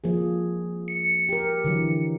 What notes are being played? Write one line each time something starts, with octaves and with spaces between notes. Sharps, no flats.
F3 A#3 G#4
C#7
G4 A#4
D3 E3 F#3